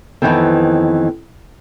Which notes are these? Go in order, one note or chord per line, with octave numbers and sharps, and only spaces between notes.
F2 A#2 D#3 E3 B3 C4